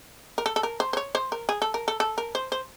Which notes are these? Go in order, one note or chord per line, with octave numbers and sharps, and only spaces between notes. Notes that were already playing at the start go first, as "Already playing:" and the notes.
A#4
A4
A4
A#4
C5
C5
C#5
C5
A#4
G#4
A4
A#4
A4
A4
A#4
C5
C5